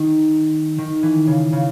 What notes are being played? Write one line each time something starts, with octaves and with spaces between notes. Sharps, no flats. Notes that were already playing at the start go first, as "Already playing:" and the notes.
Already playing: D#3
D#3
E3
C#3
C#3